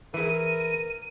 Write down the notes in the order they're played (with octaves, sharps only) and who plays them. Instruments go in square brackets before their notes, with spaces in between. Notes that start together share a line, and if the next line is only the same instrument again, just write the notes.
[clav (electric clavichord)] E3 E4 [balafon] G#4 E5 [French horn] A#4 [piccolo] D#7